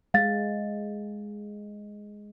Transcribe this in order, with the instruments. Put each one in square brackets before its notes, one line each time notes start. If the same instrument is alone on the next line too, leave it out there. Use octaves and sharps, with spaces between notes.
[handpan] G#3 [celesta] F5 A6